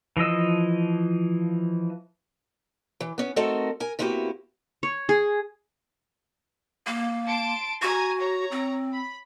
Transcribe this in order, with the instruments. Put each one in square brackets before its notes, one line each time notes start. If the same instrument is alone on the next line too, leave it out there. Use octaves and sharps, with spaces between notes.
[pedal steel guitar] E3 F3 D#5 E6
[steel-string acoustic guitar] E3
B3 C#4
A3 C4 D#4 F#4 A4 A#4
A#4 G#5
C3 A#3 B3 E4 F#4 G4
[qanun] C#5
G#4
[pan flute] A#3
[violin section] A5 C6 D7
[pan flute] F#4 [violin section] G#5 A#5
[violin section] C#5 A#5
[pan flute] C4
[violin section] B5